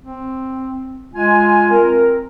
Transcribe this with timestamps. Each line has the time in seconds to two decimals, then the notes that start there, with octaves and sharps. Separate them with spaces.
0.02 C4
1.14 G#3 F4 G#5
1.70 C4 A#4